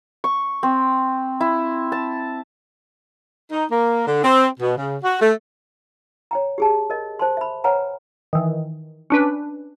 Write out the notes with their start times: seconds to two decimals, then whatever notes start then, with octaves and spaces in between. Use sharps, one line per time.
0.24 C#6
0.63 C4
1.40 E4
1.92 A5
3.51 D#4
3.72 A#3
4.07 D3
4.24 C4
4.60 B2
4.77 C#3
5.03 F#4
5.20 A3
6.31 C#5 G5 A#5
6.58 G4 G#4 A5
6.90 A#4 D#5
7.19 C5 A5 C6
7.37 E5 B5
7.64 B4 C#5 F#5 G#5 A#5
8.33 D#3 E3
9.10 C#4 D4 B4